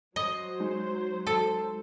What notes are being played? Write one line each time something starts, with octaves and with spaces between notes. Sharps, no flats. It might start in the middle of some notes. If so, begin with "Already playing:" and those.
F#3 C5 D#5
G#3 D#4
A4